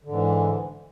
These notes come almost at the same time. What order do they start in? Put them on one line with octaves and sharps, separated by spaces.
D3 G#2 E3